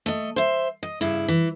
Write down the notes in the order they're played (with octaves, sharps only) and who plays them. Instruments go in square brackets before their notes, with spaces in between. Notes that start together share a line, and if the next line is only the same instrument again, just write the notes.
[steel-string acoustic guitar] A3 D#5
C5 E5
D#5
G2 C#3 E4
E3